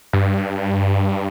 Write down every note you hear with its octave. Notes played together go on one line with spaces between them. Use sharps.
G2